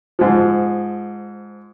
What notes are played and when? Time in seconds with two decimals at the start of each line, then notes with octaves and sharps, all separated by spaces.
0.19 G#2 F3